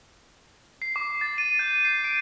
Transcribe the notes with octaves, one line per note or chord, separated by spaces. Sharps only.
C7
D6
A6
D#7
G6
C7
D7